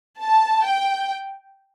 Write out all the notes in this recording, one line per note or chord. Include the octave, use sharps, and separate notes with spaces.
A5
G5